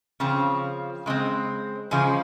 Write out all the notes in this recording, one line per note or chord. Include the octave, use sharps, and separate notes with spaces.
C#3 F3 C4
C#3 G#3 C4
C#3 F3 G#3 G#4